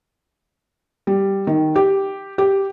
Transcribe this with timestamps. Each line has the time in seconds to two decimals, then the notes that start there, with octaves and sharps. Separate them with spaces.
1.07 G3
1.47 D#3
1.76 G4
2.38 G4